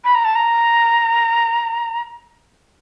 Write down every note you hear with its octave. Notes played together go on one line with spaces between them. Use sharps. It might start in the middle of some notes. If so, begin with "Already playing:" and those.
B5
A#5
A5
A#5